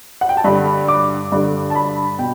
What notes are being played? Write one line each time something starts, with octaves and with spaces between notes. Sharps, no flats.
F#5
G5
A5
G2 D3 B5
D6
G2 D3
A5
B5
B2 G5